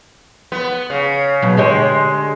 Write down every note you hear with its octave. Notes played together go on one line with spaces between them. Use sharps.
B3
C#3
B2 F#3
D3 G#3 G4 C#5